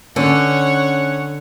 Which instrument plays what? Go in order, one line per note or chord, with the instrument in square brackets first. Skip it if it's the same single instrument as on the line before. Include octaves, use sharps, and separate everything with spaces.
[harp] D3 [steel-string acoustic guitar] C#4 [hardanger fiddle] C#5 F#5